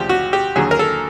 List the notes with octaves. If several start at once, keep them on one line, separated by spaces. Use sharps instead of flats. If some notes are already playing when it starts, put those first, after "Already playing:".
Already playing: D2 C#3 F3 G4
F#4
G4
D#2 D3 F#3 G#4
A#4
A4